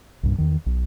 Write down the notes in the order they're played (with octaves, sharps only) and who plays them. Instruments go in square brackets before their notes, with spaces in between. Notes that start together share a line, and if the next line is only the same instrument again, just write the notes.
[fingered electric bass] C2 G2 A#2
E2 D#3
B1